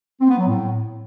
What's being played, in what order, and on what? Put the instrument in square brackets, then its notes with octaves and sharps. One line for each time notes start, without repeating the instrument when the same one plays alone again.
[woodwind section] C4
B3
F#3
A2